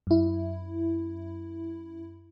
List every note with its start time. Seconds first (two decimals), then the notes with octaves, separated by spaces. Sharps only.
0.07 F#2 E4